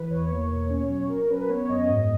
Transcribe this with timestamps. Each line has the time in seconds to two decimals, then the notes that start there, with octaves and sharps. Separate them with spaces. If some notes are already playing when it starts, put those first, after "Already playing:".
Already playing: E3 B4
0.10 E2 C#5
0.30 A#3
0.51 B2
0.69 C#4
0.90 F#3
1.09 F#3 A#4
1.29 C#4 B4
1.49 B3 C#5
1.69 F#2 D#5
1.89 G#2